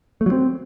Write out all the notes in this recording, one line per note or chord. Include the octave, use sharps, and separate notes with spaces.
A3
F#3
C4